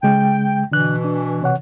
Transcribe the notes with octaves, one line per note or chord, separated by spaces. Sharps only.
C#3 G#3 G5
B2 D3 E3 D4 F#6
D4
C3 C#5 F#5